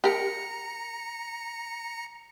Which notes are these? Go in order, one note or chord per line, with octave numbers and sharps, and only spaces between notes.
G4 A#4 A#5 C#7